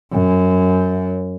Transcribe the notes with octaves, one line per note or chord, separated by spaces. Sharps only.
F#2